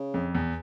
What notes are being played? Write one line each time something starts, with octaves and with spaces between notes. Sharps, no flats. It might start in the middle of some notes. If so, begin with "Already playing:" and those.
Already playing: C#3
F2
E2